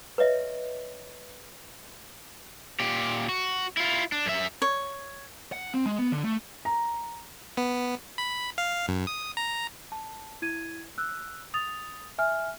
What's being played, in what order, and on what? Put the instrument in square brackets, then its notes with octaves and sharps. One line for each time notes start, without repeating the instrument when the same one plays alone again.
[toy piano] B4 C#5 D#5 E5
[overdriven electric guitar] A#2 G4
F#4
E4 F4
D4
F#2 E5
[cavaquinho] C#5
[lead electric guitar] F#5
C4
G#3
B3
D3
A3
[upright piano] A#5
[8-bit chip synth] B3
B5
F5
F#2
D#6
A#5
[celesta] A5
E4 G#6 D#7
E6 F#6
D#6 A6 F7
E5 G#5 F6